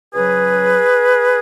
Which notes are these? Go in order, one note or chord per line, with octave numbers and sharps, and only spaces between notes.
C#2 C#3 F#3 G#4 B4